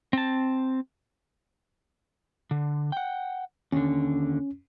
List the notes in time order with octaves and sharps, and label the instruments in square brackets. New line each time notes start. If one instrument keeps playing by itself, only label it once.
[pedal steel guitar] C4 A5
[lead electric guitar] D3
F#5 G5
[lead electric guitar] D#2 D3 [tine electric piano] C#4